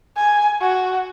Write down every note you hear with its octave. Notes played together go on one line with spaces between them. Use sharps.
G#5
F#4